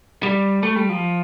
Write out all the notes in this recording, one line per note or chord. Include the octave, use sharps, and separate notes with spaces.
G3
A3
G3
F3